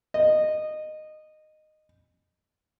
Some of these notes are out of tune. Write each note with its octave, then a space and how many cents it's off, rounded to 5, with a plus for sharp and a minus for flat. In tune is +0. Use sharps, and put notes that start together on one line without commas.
D#5 -15